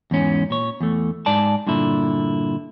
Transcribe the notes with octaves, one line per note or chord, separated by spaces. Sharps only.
E2 G#2 C#4
A#2 C#5
E2 A3
G#2 D5 A5
G2 A#2 D3 E4